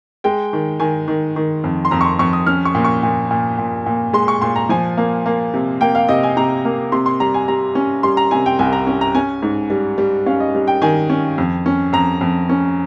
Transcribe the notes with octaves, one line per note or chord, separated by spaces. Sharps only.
G#3 G5
D#3
D#3 G#5
D#3
D#3
F2
C6
F2 A#5
C#6
C6
F2 C#6
D#6
C#4 F6
C#6
A#2
C#6
A#2
A#2
A#2
A#2
G#3 C6
C#6
A#2 C6
A#5
F3 G#5
A#3
A#3
C3
A#3 G5
F5
C3 D#5
G#5
C3 A#5
A#3
C3 C6
C6
G3 A#5
G#5
G3 A#5
C#4
G3 C6
A#5
C3 G#5
G5
C2 G#5
A#5
C#4
A#5
C#4 G#5
G#2
G3
G3
C#4 F5
D#5
G3
G5
D#3 G#5
C#4
F2
C#4
F2 A#5
F2
C#4